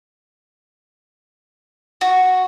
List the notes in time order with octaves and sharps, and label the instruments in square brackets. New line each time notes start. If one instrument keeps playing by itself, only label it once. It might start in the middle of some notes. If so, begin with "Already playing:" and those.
[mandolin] F#4